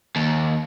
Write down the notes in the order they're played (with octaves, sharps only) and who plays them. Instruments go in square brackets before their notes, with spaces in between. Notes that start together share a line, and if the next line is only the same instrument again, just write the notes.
[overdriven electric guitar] D#2